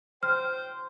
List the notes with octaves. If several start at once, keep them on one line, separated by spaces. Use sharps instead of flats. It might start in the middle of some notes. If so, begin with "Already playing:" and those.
C5 G5 F6